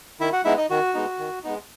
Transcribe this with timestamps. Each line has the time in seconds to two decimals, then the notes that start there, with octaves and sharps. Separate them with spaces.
0.20 D#3 E4 E5
0.32 F#4 F#5
0.45 G#3 B3 D#4 E4 E5
0.57 D#4 D#5
0.70 D#3 F#4
0.94 G#3 B3 D#4
1.19 D#3
1.44 G#3 B3 D#4